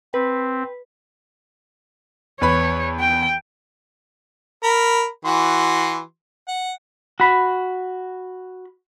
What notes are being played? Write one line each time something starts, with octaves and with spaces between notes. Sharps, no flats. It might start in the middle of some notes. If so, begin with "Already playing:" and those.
C4 B4
E2 B4 C#5 B5
G5
A#4 B5
E3 F#4 C6
F#5
F#4 B5